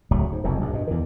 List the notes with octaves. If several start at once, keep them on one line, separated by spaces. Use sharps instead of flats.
D1 C#2 F#3 A3
G#2
F#1 C2 F2 B2
A#1 G2
G2 B2
E2 D#3